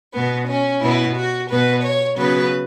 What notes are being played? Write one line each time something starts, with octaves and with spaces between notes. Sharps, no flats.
B2 B3
C#4
B2 B3 E4
F#4
B2 B3 B4
C#5
C#3 F#3 B3 B4